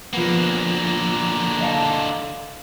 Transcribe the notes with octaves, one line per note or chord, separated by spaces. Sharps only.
D3 F3 A#3 B3
D#5 F5 A5